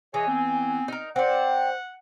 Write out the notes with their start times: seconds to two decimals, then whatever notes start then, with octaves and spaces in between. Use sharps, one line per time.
0.14 E3 G#4 C#5 D#5 G#5
0.28 B3 C4
0.88 D#4 A#4
1.16 C4 C5 D5 F#5